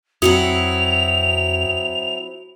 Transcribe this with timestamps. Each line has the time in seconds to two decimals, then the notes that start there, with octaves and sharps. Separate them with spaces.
0.22 F2 F#3 C4 E4 F#4 D#6 F7